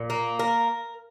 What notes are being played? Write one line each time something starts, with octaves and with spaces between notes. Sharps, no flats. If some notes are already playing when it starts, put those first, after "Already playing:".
Already playing: A#2
A#3
A#4